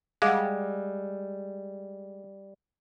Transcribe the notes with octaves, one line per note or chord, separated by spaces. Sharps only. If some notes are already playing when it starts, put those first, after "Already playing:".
G3 G#3 F5 F#5 D6